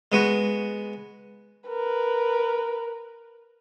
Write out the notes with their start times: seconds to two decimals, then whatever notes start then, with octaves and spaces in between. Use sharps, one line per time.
0.12 G#3 B3 F#4
1.68 A#4 B4